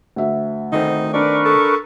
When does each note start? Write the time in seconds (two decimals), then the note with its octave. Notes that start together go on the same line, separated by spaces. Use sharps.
0.16 D2 E5
0.72 D#3 A3 C4 D#4
1.13 D4 A#4 B4 D5 C#6
1.45 A4